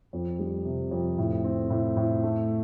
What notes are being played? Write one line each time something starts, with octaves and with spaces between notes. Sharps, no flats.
F2
G3
C3
F2
A2
C4
A2
A2
A3